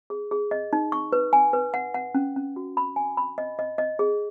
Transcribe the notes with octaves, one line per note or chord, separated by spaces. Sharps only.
G#4
G#4
D#5
D#4
C#6
B4
G#5
B4
F#5
F#5
C#4
C#4
F#4
B5
G#5
B5
D#5
D#5
D#5
G#4